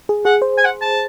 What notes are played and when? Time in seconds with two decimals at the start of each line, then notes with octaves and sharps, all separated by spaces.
0.09 G#4
0.25 G#4 F#5
0.42 C5
0.58 G#5
0.65 F#5
0.81 A5